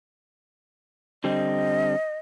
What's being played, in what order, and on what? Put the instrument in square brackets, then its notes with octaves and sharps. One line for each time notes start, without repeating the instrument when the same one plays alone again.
[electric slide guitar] D3 G3 C4 [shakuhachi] D#5